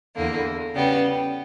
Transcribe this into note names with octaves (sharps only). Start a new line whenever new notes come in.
E2 D3 A#3
C#3 G3 B3